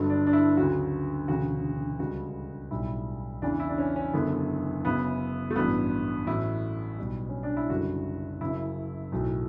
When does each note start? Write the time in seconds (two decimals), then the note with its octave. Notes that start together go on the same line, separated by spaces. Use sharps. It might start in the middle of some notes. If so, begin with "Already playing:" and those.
Already playing: G1 G2 D3 F#3
0.10 D4
0.26 D4
0.33 E4
0.57 D2 C#3 F#3 F#4
1.28 E1 D2 C#3 F#4
1.99 C#2 C#3 G3 F#4
2.71 B1 A2 G3 E4
3.42 E2 C#3 E3 D4
3.60 E4
3.69 D4
3.78 C#4
3.96 C#4
4.13 F#1 F#2 D3 B3
4.84 F#1 F#2 C#3 F#3 B3
5.50 A3
5.56 A1 G2 F#3 B3
6.27 A1 A2 F#3 E4
6.98 B1 B2 G3
7.29 C#4
7.43 D4
7.57 E4
7.69 F#1 F#2 D3 G3 F#4
8.41 F#1 F#2 C#3 E4
9.12 B1 A2 F#3